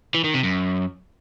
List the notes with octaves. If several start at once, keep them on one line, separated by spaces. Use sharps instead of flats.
E3
D#3
C3
F#2